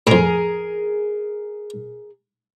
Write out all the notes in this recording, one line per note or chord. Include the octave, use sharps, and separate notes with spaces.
F2 A2 G#4 A#4